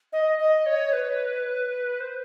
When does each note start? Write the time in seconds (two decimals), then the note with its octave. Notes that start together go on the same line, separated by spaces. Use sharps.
0.13 D#5
0.39 D#5
0.66 C#5
0.93 B4
2.00 C5